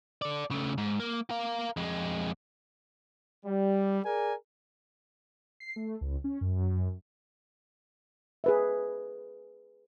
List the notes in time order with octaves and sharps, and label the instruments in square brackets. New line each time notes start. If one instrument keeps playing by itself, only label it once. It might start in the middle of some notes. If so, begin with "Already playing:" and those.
[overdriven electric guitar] A4 D5
C#3 A3
G#2
A#3
A#4 F5
F2 G#3
[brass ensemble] G3
G#4 A#4 D5 G#5
[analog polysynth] C7
A3
C#2
C#4
F#2
[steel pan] G#4 B4 E5